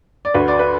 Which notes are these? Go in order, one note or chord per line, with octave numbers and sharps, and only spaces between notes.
D5
D2 F#4 B4
D5
B4